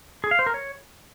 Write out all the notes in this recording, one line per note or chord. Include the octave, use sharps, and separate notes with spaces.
G#4
F5
C5
A#4
C#5